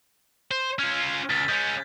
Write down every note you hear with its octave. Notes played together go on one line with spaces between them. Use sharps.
C5
C#4 F4 F6 G#6
C#2 A6 B6
G#3 C#4 G6